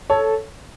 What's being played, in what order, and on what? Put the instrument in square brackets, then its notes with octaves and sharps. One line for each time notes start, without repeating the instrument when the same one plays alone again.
[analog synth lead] A4 [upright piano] C#5